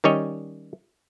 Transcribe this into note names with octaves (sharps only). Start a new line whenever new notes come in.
D#3 G3 C#4 C#5 D#5